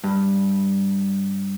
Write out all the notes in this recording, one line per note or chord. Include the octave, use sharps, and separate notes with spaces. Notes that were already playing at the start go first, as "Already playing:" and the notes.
G2